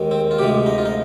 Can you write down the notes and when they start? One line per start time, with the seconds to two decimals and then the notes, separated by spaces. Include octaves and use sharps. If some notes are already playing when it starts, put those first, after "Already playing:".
Already playing: D#2 D#3 G#3
0.11 C4
0.31 F4
0.38 D2 C3 F3 G#3 G4
0.66 D#4
0.78 F4
0.85 D#4